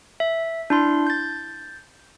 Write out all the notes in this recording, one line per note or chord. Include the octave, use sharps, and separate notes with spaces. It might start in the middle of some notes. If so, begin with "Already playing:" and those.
E5
D4 E4 C6
G6 A6